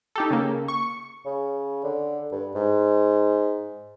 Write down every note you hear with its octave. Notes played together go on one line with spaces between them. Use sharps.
D#4 G4 A4
C#3 A#3
C#6
C#3
D3
G2
G#2